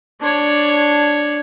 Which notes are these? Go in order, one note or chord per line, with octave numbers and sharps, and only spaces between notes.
D4 C#5